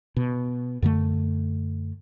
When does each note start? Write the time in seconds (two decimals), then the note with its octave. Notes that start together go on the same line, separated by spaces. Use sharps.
0.17 B2
0.82 F#2 D3 A3